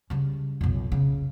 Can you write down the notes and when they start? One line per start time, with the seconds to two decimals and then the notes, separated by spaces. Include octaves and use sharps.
0.10 C#3 G3
0.61 B1 F2
0.92 C#3